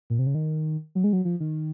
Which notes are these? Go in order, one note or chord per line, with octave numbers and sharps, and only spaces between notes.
A#2
C3
C#3
D#3
F#3
G#3
F#3
F3
D#3